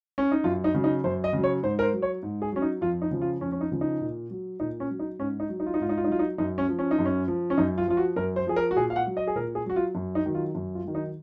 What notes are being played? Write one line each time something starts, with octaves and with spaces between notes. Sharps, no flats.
C#4
D#4
F#2 F4
D#4
C#3 F#3
D#4
F#2 C5
D#5
C#3 F#3
C#5
G#2 C5
A#4
C5
F#3
C#5
G#2
G#4
F#3 C#4
D#4
F2 F4
D#4
C#3 F3
F4
F2 C#4
C#4
D#4
C#3 F3
D#4
A#2
F#3
A#2 D#4
C#4
F#3
D#4
G#2 C#4
D#4
F#3
D#4
F4
D#4
G#2 F4
D#4
F4
D#4
F#3 F4
D#4
F#2 D#4
C#4
F3
C#4
D#4
F#2
C#4
F3
C#4
F#2 D#4
F4
F3 F4
F#4
F#2 A#4
C5
F3 G#4
A#4
F#4
A#2 G#4
F5
F#5
F#3
D#5
G#4
A#2 A#4
G#4
F#3 F#4
F4
F#2
D#4
D#3 F#3
F4
F#2
F4
D#3 F#3
D#4